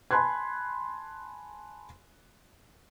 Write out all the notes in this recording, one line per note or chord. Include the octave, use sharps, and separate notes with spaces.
G#5 A5 B5 C6 F#6 G#6